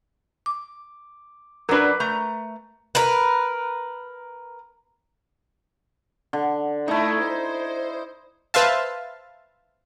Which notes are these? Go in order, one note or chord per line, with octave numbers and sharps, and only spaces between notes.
D6
F#3 D4 A#4 B4
A3 A#5
A#4 B4
D3
A3 D#4 E4
C5
B4 C5 E5 F5 A5